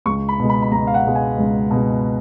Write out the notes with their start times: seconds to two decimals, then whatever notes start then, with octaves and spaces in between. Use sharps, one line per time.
0.06 C#2 C#6
0.29 B5
0.39 B2 G#3
0.50 B5
0.62 B5
0.72 C#2 A#5
0.87 F5
0.94 F#5
1.05 B2 G#3
1.15 G#5
1.38 C#2
1.71 B2
1.76 G#3